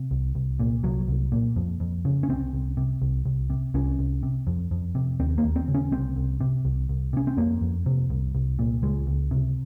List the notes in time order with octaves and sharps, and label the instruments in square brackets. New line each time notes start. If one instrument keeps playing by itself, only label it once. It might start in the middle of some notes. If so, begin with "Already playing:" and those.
Already playing: [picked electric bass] C3
C2
C2
A#2
C2 F#3
C2
A#2
F2
F2
C#3
C#4
C2 C4
C2
C3
C2
C2
C3
C2 C#4
C2
C3
F2
F2
C3
D#2 C4
A#3
D#2
C4
C#3
C#4
C2 C4
C2
C3
C2
C2
C3 C#4
C4
F2 A#3
F2
C3
C2
C2
A#2
C#2 G#3
C#2
C3